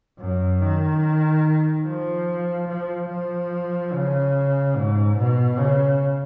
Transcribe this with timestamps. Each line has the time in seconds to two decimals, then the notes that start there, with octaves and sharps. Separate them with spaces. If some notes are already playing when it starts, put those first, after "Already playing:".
0.19 F#2
0.61 D#3
1.85 F3
2.68 F3
3.09 F3
3.93 C#3
4.76 G#2
5.18 B2
5.59 C#3